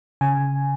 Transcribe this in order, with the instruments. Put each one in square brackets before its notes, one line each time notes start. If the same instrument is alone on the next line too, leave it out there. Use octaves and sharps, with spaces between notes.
[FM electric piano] C#3 G#5